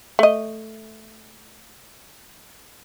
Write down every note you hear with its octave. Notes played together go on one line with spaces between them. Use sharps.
A3 D#5